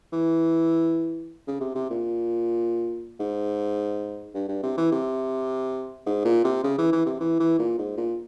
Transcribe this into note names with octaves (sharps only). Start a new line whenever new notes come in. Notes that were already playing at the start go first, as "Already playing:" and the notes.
E3
C#3
C3
C3
A#2
G#2
G2
G2
C3
E3
C3
G#2
A#2
C3
C#3
E3
E3
C3
E3
E3
A#2
G#2
A#2